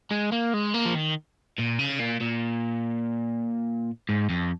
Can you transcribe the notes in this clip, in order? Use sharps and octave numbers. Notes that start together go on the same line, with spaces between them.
G#3
A#3
G#3
A#3
F3
D#3
A#2
C#3
A#2
A#2
G#2
F2